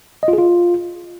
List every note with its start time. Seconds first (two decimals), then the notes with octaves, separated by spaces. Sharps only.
0.23 D#5
0.28 F4
0.33 G#4
0.38 F4